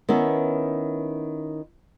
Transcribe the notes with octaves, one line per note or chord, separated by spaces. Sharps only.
D#3 B3 C#4 E4